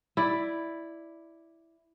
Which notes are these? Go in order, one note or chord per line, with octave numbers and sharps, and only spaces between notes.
E4 D5